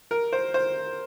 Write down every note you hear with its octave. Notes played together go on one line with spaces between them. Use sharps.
A#4
C5
C5